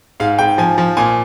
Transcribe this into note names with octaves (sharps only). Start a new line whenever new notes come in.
G#2 F5
G#2 G5
F3 G#5
F3
A#2 G#5